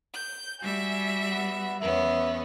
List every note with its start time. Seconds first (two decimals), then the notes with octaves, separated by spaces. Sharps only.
0.14 G6
0.61 G3 F#4 E5 G#5
1.30 B3
1.80 E2 B3 C#4 E5